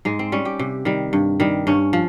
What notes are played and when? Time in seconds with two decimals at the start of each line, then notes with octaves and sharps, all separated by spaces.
0.05 G#2 G#3
0.19 C4
0.32 G3 C#4
0.45 G4
0.59 C3
0.85 D#3 G3
1.13 G2
1.40 D#3 G3
1.67 G2 C#4
1.93 F3